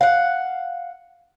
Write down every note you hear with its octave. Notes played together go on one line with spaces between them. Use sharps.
F5 F#5